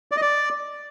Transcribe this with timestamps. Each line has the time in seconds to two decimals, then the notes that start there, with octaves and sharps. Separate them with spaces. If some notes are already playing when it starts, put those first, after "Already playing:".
0.11 D5
0.17 D#5
0.22 D5